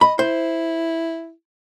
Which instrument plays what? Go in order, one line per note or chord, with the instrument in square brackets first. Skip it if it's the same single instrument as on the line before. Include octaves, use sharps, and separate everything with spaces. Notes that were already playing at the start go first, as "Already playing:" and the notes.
[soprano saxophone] D#5 [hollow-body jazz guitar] B5
[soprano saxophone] E4 [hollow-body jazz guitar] C5